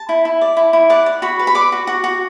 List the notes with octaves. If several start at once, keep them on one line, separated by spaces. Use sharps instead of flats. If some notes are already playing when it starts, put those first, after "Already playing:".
Already playing: A5
E4
E4
D5
E4
E4
D5 F#5
D5
F#4 B5
B4
B5
D5 D6
F#4
F#4
F#4